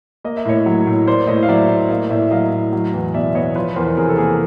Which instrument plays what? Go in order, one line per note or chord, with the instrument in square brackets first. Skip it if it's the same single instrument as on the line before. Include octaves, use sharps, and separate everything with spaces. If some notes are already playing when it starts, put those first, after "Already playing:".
[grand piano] A#3 D#5
E5
A2 C#5 D#5
F#3
A2
A#3 C5 D5
A2 C#5 D#5
F5
F#3 D5 E5
A2
A#3 D#5 F5
A2 D5 E5
F#3 D#5 F5
A2
F#3
E2
B2 D5 E5
B3 C#5 D#5
F3 B4 C#5
E2 A#4 C5
C3 G#4 A#4
A4
A#3 G#4 A#4